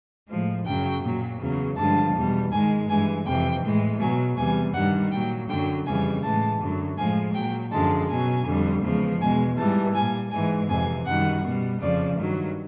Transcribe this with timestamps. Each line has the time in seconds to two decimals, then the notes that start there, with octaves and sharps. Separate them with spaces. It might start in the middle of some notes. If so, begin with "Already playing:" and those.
0.28 A2 F3 G#3
0.66 F#2 C#3 F#3 G5
1.02 A#2 F#3
1.40 E2 C#3 F#3
1.77 G2 D3 F3 G#3 A5
2.15 E2 B2 G3
2.52 G#2 D#3 G#3 G#5
2.89 G2 E3 G#3 G#5
3.26 F2 C3 E3 G5
3.63 A2 E3 G#3
4.00 B2 F#3 G#5
4.37 E2 C3 E3 G3 G#5
4.74 G2 D#3 G3 F#5
5.12 A#2 F#3 G5
5.49 F#2 D3 F#3 G5
5.86 F2 C#3 E3 G3 G#5
6.22 A2 E3 G#3 A5
6.60 F#2 D3 F#3
6.97 A2 F3 G#3 G#5
7.34 A#2 F#3 G5
7.71 F#2 D3 F3 G#3 A5
8.09 B2 F#3 G#5
8.46 F2 D3 G3
8.82 E2 C#3 F3 G#3
9.20 E2 B2 G#3 G#5
9.57 G#2 E3 G3 A5
9.94 A#2 G3 G#5
10.31 G#2 E3 G#3 G#5
10.68 F2 C3 E3 G#5
11.06 F#2 D#3 G3 F#5
11.44 B2 G3
11.80 F2 C#3 F3 D5
12.17 G2 D#3 F#3